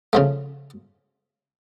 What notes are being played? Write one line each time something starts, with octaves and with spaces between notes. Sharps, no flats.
C#3 F3 A3